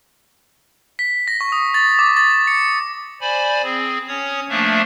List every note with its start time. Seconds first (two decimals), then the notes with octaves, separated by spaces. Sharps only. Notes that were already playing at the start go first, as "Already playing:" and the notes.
0.99 B6
1.28 A#6
1.41 C#6
1.52 D#6
1.74 A6
1.99 D6
2.17 A6
2.47 C#7
3.21 C5 D5 G#5 B5
3.63 C4 G#4
4.08 C#4 C#5 D#6
4.49 F3 A3 A#3 D4 E5